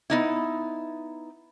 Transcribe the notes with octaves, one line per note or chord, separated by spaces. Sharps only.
B3 D#4 E4